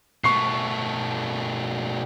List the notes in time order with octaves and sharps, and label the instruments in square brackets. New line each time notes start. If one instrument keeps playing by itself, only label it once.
[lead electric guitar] B2 A3 [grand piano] C#6 C7